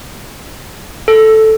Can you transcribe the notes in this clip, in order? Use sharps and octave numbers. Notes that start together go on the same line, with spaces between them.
A4